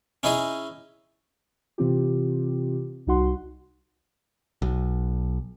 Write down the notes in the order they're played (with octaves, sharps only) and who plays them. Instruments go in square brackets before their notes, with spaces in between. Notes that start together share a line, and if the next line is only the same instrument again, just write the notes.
[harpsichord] C#4 D#4 E4 G#4 D#5
[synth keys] C3 E3 C4 F4 G4
C2 G3 D#4 F#4 F#5 C6
[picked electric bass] B1